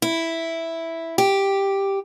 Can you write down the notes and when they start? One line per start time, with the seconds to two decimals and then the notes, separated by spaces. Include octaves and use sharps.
0.02 E4
1.18 G4